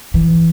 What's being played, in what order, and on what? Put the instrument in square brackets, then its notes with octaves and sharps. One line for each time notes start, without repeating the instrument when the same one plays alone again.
[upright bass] E3